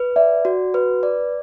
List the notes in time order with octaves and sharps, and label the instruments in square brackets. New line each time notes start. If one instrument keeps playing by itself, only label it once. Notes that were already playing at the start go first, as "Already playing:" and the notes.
Already playing: [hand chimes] B4
[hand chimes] D5 [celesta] E5
[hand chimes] F#4
B4
D5